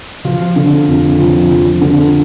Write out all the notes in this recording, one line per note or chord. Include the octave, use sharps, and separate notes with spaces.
F3 F4
D3
F2
F3
F3
D3